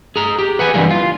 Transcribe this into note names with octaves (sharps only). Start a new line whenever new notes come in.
G#4 A#5
G4
B4 F#5 G#5
G2 E3 G3 A#3
F4